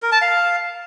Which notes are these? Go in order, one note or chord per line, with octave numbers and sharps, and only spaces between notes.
A#4
A5
F5